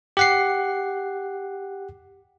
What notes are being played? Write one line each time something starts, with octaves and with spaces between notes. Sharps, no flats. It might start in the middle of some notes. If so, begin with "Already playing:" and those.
G4 F#5 C7